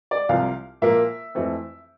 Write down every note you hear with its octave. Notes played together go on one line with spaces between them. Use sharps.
D5
C2 C3 F3 F5
A#2 F3 A#3 E5
F2 E3 A3 C4